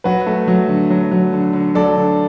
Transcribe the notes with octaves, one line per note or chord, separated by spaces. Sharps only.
F#3 F#4 B4
A3
F#3
D3
F#3
F#3
D3
D3
F#3 A4 D5
D3